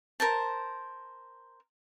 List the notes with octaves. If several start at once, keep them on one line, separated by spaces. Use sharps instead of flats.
A#4 C5 A5